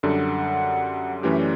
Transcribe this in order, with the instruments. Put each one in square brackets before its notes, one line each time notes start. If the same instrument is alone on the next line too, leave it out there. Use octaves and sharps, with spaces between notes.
[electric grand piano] F#2 D3 G3 D4 A4 [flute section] F#5
[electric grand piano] F#2 E3 A3 C#4 G4 [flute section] E5
[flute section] D5